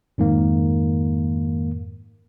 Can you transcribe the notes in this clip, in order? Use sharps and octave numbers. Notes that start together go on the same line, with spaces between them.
F2 G#2 D#3 A#3